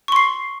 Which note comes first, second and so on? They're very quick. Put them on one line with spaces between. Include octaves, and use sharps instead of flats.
C#6 C6 C7